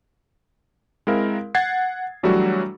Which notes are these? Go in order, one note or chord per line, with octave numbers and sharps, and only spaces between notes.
G#3 C4 E4 A#4 F5
F#5 G#6 A6 C7
E3 F#3 G3 A3 D4 F#4